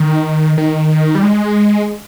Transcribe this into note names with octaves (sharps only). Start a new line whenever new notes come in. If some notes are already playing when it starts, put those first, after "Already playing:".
Already playing: D#3
D#3
G3
G#3